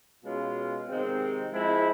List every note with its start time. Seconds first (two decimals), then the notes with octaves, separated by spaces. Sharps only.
0.24 B2 G#3 C#4 F4
0.89 C3 D#3 G#3 C4
1.53 F3 G#3 C4 E4